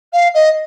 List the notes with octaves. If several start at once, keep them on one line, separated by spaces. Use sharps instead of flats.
F5
D#5